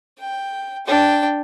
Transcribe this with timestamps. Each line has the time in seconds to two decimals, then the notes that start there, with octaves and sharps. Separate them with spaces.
0.19 G5
0.86 D4 G5